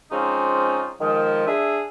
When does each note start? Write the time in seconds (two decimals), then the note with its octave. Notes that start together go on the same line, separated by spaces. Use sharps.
0.12 F3 G#3 C4 C#4 D#4 F4
1.01 D#3 F3 G#3
1.47 D4 G#4 E5